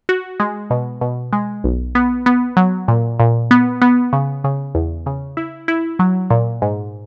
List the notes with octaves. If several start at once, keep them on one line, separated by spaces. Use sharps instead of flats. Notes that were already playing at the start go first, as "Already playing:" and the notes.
F#4
G#3
B2
B2
G#3
B1
B3
B3
F#3
A#2
A#2
B3
B3
C#3
C#3
E2
C#3
E4
E4
F#3
A#2
G#2